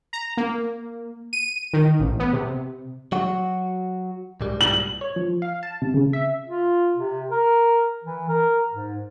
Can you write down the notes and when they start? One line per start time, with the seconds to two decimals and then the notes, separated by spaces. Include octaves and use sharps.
0.13 A#5
0.37 A#3
1.33 D#7
1.73 D#3
2.00 A1
2.20 B3
2.33 C3
3.12 F#3 F#4
4.41 C2 G#2 G3
4.61 F#7
5.01 C#5
5.16 F3
5.42 F5
5.63 A5
5.82 C3
5.94 C#3
6.13 E5
6.46 F4
6.97 C3
7.30 A#4
8.04 E3
8.29 A#4
8.72 G#2